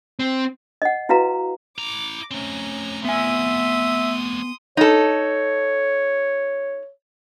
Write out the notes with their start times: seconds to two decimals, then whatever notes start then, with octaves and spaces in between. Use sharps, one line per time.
0.19 C4
0.82 D#5 F#5
1.09 E4 F#4 B4 F5 A#5
1.78 E4 A#5 D6
2.31 A3 C4 C#4 A#5
3.05 B3 E5 G#5 C6 D#6
4.77 D#4 A4 C#5